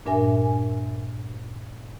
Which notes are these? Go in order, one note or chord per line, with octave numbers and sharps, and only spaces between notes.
G2 A#2 D4 A#4 E5 G#5